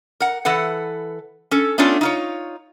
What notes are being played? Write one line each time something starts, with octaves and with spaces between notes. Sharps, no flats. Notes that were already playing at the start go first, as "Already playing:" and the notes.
A#4 F#5
E3 A4 B4 F#5
C#4 A4
A3 B3 C#4 D4 F4 A4
D#4 F4 C#5